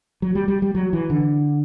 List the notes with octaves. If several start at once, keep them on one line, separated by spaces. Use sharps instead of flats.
F#3
G3
G3
G3
F#3
E3
D3